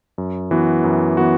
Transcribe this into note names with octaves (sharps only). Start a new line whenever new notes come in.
F#2
E3 B3 F#4
F#2
E3 B3 F#4